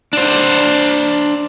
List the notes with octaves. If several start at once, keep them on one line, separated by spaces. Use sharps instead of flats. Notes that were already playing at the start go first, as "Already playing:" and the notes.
D4 C5